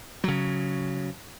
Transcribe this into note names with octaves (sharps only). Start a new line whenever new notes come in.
C#3 F#3